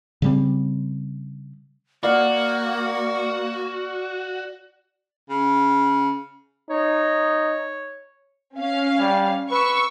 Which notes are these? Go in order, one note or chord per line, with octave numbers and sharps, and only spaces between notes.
C#3 G3 C4
A#3 F#4 D5 F5 F#5
C#3
D#4 C#5
C#4 F5
G3
B4 C#6 E6